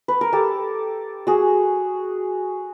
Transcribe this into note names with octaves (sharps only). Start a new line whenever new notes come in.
B4
A#4
G4 A4
F#4 G#4